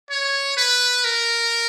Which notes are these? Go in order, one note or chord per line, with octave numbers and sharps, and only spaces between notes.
C#5
B4
A#4